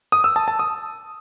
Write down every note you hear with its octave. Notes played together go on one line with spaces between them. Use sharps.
D#6
E6
A5
A5
D#6